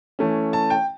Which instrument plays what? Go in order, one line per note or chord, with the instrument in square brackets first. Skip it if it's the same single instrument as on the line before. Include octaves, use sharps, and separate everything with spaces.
[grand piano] E3 A3 C#4
A5
G5